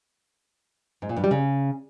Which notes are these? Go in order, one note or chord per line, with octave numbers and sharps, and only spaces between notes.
G#2
A#2
G2
G3
C#3